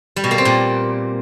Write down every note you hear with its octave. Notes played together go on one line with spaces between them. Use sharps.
G3
B2
A#3
C4
A#2